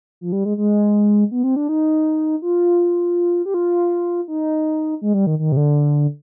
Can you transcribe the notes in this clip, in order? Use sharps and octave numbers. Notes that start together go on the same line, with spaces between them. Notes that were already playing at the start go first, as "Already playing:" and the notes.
F3
G3
G#3
G#3
B3
C4
D4
D#4
F4
G4
F4
D#4
G#3
G3
D#3
D#3
C3
D3